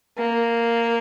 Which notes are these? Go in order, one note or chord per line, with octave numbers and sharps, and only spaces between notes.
A#3